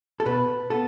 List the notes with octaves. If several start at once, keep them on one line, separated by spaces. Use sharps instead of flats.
A4
B2 B4
B3 A4